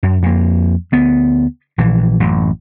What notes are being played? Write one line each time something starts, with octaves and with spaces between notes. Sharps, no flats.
F#2
F2 A#3
D2 B3
A#1 E3
A1 F#2